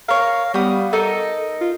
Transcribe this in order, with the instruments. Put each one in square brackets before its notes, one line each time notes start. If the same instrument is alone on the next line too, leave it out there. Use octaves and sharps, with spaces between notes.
[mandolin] A#4 C#5 [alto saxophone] F5
[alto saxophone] G3 [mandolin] B3 F5 D#6
[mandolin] D#4 A#4 D#5 [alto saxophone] A4
[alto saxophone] F4